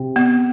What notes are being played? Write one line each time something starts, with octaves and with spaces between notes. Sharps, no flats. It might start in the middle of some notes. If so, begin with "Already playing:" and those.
Already playing: C3
B3